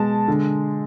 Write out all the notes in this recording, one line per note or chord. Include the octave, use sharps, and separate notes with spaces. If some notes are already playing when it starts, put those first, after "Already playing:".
Already playing: B2 G#3 A5
D3